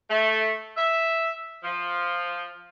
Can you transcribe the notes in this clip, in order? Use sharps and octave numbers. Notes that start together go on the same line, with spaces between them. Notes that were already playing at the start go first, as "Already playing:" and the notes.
A3
E5
F3